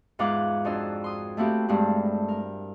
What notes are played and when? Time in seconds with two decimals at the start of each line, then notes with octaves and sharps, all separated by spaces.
0.19 E2 G#2 F4 F#5 D6
0.64 F2 D4 F#4 D#5 C6 E6
1.04 C6 D#6
1.37 A3 A#3 C4 E4 F#4 G4
1.68 G2 G#3 A3 C4 E4
2.28 A#4